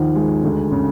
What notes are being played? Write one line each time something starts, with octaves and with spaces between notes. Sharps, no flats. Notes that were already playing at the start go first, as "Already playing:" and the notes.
Already playing: D#2 D#3 F3 F#5
G#3
D2
C#3